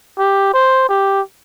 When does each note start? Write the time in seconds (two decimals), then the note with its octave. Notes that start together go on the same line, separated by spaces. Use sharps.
0.18 G4
0.53 C5
0.89 G4